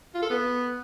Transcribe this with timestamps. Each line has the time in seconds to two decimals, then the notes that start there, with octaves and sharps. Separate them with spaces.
0.14 F4
0.22 A4
0.30 B3